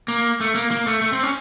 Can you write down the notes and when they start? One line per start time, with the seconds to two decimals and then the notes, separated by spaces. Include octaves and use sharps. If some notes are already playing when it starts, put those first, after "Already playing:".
0.08 A#3
0.41 A3
0.55 A#3
0.71 A#3
0.87 A3
1.02 A3
1.13 C4
1.23 C#4